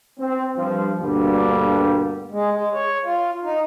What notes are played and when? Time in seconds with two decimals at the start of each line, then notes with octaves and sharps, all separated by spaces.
0.20 C4
0.57 G2 F3
1.00 D2 G2 B2 D3 G3 A#3
2.31 G#3
2.52 G#3
2.73 C#5
3.04 F4
3.44 D#4